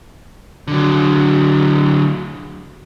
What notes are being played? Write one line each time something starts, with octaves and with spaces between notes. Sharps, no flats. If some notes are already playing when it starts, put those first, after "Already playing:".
D3 F#3